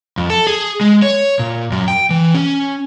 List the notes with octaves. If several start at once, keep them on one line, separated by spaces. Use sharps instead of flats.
F2
A4
G#4
G#3
C#5
A#2
F#2
G5
E3
C#4